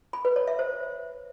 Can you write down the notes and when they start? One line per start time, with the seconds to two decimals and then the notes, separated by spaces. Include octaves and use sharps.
0.13 B5
0.25 B4
0.36 C#5
0.47 E5
0.59 C5